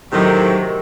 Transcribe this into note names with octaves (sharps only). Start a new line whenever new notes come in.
A2 C3 D#3 F#3